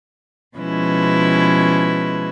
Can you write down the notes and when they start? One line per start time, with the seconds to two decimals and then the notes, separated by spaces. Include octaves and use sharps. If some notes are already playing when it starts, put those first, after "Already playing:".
0.58 B2 F3 G#3 C#4 E4 B4